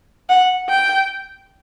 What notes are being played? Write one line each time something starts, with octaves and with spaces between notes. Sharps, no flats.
F#5
G5